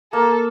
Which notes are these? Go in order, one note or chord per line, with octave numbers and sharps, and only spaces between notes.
A#3 A4